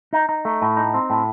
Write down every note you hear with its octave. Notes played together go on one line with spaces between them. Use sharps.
D#4
D#4
A3
A2
D#4
C4
A2